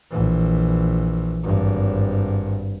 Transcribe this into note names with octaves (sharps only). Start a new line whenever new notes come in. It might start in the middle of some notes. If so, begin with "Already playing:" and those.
A#1 E3
G#1 G2